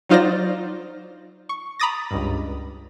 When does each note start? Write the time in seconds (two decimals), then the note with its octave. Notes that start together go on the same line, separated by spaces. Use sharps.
0.09 F#3 D#4 F4 C5 D5 A#6
1.49 C#6
1.80 A#5 B5 D6 D#6 A6 A#6
2.11 C#2 G2